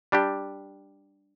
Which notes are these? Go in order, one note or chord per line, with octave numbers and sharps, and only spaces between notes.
G3 D4 G4